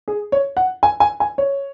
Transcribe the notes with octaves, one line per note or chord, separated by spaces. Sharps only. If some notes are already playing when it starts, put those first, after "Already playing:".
G#4
C#5
F#5
G#5
G#5
G#5
C#5